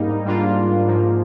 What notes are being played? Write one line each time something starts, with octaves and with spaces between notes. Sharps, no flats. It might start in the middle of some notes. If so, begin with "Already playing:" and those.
Already playing: G#2 G3 A#3 D#4
G#2 G3 A#3 D4 F4
G#2 F3 A#3